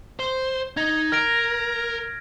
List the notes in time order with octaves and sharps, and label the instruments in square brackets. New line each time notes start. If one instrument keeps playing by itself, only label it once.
[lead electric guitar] C5
[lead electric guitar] D#4 [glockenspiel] G#6
[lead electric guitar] A#4 [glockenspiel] F6 A#6 D7